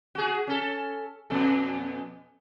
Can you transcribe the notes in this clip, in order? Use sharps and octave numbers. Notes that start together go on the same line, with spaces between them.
F#4 G#4
C#4 A4
F2 B2 A4